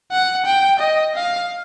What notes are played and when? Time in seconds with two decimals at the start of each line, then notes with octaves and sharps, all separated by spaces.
0.11 F#5
0.45 G5
0.79 D#5
1.15 F5